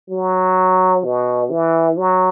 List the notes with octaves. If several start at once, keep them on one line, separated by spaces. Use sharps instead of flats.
F#3
B2
E3
F#3